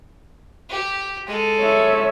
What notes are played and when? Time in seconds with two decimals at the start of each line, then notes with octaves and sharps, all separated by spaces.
0.69 G4
1.26 G#3 A4
1.61 C#5 E5